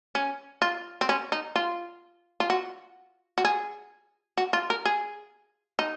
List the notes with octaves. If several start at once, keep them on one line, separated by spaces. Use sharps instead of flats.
C#4
F4
C4
C#4
D#4
F4
F4
F#4
F#4
G#4
F#4
F4
A#4
G#4
D#4